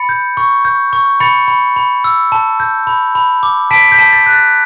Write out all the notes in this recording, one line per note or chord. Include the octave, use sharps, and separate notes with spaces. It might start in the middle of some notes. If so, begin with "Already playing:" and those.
Already playing: B5 A6 C#7
G6
C#6
G6
C#6
B5 A6 C#7
B5
B5
E6
A5
G6
B5
B5
D6
A5 B6 D7
G6 B6
A5
A6
F#6
A6